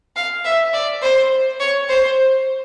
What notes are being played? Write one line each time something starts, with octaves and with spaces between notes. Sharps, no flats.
F5
E5
D5
C5
C#5
C5